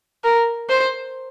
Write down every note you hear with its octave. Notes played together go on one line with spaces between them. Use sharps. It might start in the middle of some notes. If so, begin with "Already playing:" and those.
A#4
C5